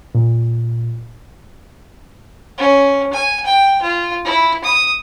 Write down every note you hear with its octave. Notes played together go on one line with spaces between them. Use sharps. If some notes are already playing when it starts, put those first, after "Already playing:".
A#2
C#4
G#5
G5
F4
E4
D#6